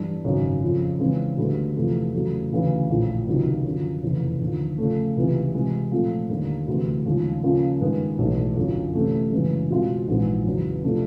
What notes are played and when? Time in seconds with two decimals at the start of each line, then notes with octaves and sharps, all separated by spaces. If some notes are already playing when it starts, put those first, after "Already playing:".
Already playing: G2 E3 G3 B3 D4
0.24 G#1 F#2 C#3
0.62 F2 C#3 F3
0.99 C#3 E3 G#3 C4
1.37 D2 D3 G3 B3
1.75 E2 C3 F3 A3
2.13 E2 C#3 F#3 A3
2.52 D2 C#3 E3
2.89 A#1 A2 F3
3.27 C#2 C3 D#3 F#3 A#3
3.65 F#2 D3 F3
4.02 F1 E2 C#3
4.40 D#2 D3 F3
4.78 C#3 F3 A3
5.17 C#2 C3 E3
5.54 C3 E3 G#3
5.91 A#2 F3 A3 C4 F4
6.29 D#2 D3 G3 A#3
6.67 D2 C3 E3
7.05 D#2 C#3 F3 G#3
7.43 C#3 F3 A#3 C#4 F4
7.81 G2 D#3 G#3 B3
8.18 B1 A2 E3
8.56 G1 F#2 D3
8.94 C3 E3 A3 C#4
9.32 F#2 C#3 E3 G#3
9.70 B2 G#3 C4 F4
10.08 A#1 G#2 E3 G#3
10.46 E2 C#3 F#3 B3
10.83 C3 F3 A3 D4